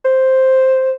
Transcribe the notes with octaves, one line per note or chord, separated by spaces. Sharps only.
C5